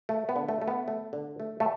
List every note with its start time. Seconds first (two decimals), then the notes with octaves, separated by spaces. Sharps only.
0.09 A3
0.29 B3
0.36 D3
0.49 A3
0.62 A3
0.68 B3
0.88 A3
1.13 D3
1.40 A3
1.60 A3